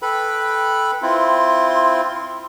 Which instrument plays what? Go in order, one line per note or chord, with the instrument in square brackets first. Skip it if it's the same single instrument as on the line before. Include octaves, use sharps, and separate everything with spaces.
[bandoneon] A4 B4 B5 [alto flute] G5
[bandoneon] C4 E4 F4 [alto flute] C6